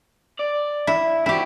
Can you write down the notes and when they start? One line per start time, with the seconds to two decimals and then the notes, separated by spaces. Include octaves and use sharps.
0.40 D5
0.87 E4
1.26 C4 E4 F#4 G4